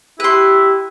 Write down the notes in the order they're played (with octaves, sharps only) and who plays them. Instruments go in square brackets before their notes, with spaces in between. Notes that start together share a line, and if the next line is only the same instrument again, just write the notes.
[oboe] E4 [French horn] G4 [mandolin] B4 C6